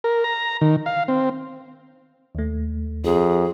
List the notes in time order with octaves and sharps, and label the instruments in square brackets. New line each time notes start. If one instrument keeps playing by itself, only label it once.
[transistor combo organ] A#4
A#5
D#3
F5
C4
[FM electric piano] D#2 A3
[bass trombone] F2 [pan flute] G#4